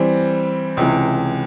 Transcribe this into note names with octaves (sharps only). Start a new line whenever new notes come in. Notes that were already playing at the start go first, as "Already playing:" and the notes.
Already playing: E3 G3 C4
C#2 C3 E3